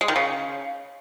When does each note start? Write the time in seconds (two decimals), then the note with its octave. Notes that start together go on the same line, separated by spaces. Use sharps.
0.01 G#3
0.08 D#3
0.16 C#3